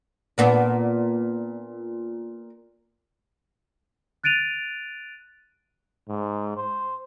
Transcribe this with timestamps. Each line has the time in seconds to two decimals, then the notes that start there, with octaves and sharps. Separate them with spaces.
0.38 A#2 B3 D4
4.24 F#6 A6 D7 D#7 F7
6.08 G#2
6.57 C5